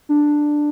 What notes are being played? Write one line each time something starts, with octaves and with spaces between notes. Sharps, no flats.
D4